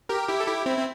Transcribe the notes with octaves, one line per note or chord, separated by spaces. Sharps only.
G4 A#4
E4 G4
A4
E4 G4
C4 E4
C4